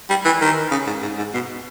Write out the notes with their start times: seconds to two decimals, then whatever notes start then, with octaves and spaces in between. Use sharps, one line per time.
0.10 G3
0.25 E3
0.41 D#3
0.71 C#3
0.87 G#2
1.02 G#2
1.18 G#2
1.34 B2